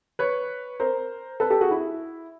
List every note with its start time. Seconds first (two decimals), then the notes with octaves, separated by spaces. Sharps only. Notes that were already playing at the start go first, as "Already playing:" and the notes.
0.19 B4 C#5
0.80 A#4 C5
1.40 A4 B4
1.50 G4 A4
1.61 F#4 G#4
1.71 E4